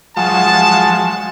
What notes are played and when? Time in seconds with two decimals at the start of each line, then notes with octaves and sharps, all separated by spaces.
0.17 F3 F#3 G#3 A5